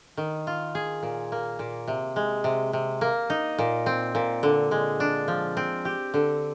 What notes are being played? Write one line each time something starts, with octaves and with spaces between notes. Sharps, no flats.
D#3
F4
G#4
A#2
A#3
A#2
C3
G#3
C3
C3
A#3
D#4
A#2
C4
A#2
D3
G#3
D4
F3
C4
G4
D3